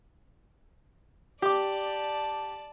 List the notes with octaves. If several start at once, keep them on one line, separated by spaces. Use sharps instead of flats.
G4 D5 A5 D6